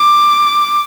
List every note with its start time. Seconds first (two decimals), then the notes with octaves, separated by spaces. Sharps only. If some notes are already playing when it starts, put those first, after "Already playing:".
Already playing: D6